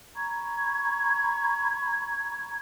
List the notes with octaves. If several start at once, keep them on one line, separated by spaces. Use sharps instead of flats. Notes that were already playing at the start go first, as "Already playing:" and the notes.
A#5 B5 C#6 G#6